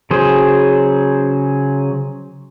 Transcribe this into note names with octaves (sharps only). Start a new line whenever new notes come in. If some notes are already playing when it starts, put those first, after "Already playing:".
C#3 F#3 G#4 C5